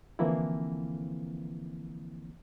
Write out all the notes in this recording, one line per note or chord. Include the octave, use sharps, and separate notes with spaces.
D3 E3 F3 A#3 C4 E4